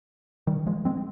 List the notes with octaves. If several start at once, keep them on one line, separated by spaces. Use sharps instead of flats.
D#3 G3
F3 G#3
G#3 C4